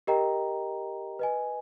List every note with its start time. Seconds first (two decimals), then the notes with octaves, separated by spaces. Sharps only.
0.07 G4 A#4 D#5 G5 A#5
1.19 B4 D#5 G#5